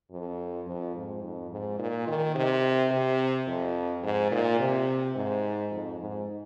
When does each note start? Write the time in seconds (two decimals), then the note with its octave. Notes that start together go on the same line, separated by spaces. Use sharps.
0.11 F2
0.67 F2
0.95 G#2
1.23 F2
1.51 G#2
1.79 A#2
2.07 D#3
2.35 C3
2.91 C3
3.47 F2
4.03 G#2
4.31 A#2
4.60 C3
5.16 G#2
5.72 F2
6.00 G#2